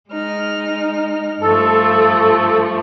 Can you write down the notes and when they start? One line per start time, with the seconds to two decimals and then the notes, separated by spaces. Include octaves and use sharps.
0.11 G#3 D#4 F6
1.41 G2 F3 A3 A4